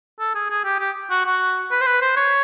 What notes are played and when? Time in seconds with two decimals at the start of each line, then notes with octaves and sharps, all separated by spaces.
0.19 A4
0.35 G#4
0.50 G#4
0.65 G4
0.80 G4
1.10 F#4
1.26 F#4
1.71 B4
1.81 C5
1.86 B4
2.01 C5
2.16 C#5